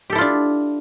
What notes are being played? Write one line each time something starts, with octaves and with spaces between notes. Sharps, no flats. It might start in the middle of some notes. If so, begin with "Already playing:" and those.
D4 E4 F4 G4 A4